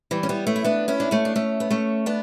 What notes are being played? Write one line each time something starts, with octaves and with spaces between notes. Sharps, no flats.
E3 G3
C#4
G3 B3
A3 C#4
E4
B3 D4
C#4 E4
D4
A3 C#4
D4
A3 C#4
B3
A3 C#4
B3 D4